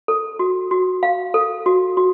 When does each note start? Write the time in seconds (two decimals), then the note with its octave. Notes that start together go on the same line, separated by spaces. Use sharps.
0.08 A4
0.39 F#4
0.71 F#4
1.03 F5
1.34 A4
1.66 F#4
1.97 F#4